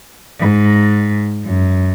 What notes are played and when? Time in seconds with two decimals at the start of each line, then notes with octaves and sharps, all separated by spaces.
0.39 G#2
1.45 F#2